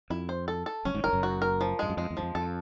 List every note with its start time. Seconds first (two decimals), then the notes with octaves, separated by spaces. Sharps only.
0.10 F2 E4
0.29 C5
0.48 A4
0.66 A4
0.85 F#1 F#2 C#4
0.94 G#1 G#2
1.04 G1 G2 A#4
1.13 F#1 F#2
1.23 F#4
1.42 A#4
1.61 F3
1.79 G2 G#3
1.90 F#2
1.97 F2 G#3
2.10 E2
2.17 F#2 F3
2.22 F2
2.35 F2 A4